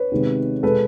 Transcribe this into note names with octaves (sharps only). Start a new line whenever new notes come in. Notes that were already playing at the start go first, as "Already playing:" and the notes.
Already playing: B4 C#5
C3 D#3 G#3 B3
B2 G#3 B3 A4 B4